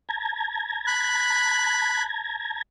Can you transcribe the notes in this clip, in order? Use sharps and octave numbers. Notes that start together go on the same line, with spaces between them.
A5 A#5 G#6
B5 F#6